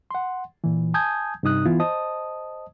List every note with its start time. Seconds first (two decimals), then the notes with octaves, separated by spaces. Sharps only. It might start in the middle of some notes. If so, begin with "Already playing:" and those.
0.11 F#5 C6
0.64 A#2 E3
0.94 G#5 A5 D#6 G6 G#6
1.43 G2 C3 D#4 D#6 F#6
1.65 E3 B3 E4 F4
1.80 C5 D#5 A5 D#6